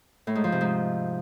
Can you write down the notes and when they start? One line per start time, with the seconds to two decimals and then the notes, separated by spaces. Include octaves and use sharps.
0.27 A2
0.35 G#2
0.44 F3
0.52 C3
0.61 G#2